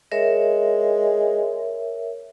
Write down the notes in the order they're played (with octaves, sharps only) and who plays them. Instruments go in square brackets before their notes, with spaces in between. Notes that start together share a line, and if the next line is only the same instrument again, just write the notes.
[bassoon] G#3 [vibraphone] A#4 C#5 E5